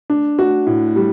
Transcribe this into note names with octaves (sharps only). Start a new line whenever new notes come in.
D4
F#4
A2
G3